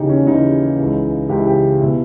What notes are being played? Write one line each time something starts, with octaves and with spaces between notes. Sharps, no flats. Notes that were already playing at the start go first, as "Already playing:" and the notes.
Already playing: D#2 C#3 E3 D#4 G4
C#4
D#2 C#3 E3 D#4
C#2 C#3 E3
C#2 C#3 E3 G4
E4
G4
B2 E4